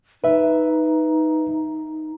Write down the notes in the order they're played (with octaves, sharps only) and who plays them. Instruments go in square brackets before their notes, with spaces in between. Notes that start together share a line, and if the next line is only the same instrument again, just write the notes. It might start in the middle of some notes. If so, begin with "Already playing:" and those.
[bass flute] D#4 [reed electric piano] B4 E5